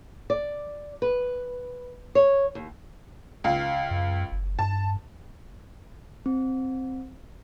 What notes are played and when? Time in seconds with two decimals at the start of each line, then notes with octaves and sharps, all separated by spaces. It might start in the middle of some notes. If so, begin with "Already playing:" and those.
0.30 D5
1.02 B4
2.15 C#5
2.55 D#2
3.44 C#2 F5
3.90 F#2
4.32 F#1
4.59 G2 A5
6.26 C4